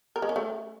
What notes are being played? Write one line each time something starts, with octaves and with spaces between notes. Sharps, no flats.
A#4
G#3
C#4
A3